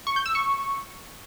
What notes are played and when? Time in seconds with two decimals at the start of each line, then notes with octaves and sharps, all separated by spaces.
0.07 C#6
0.16 G6
0.26 E6
0.35 C#6